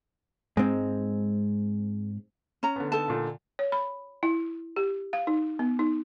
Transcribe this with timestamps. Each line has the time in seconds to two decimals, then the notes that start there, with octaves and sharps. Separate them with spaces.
0.57 G#2 G#3 C4
2.63 C#4 A#5
2.76 D3 B3
2.92 D#4 A4 A5
3.08 A#2 D3
3.59 C#5
3.72 B5
4.23 E4
4.76 G4
5.13 F5
5.27 D#4
5.59 B3
5.79 D#4